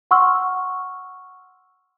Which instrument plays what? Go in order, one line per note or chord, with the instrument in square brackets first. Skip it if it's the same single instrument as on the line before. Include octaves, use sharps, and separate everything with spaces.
[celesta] F#5 C6 C#6 E6 F6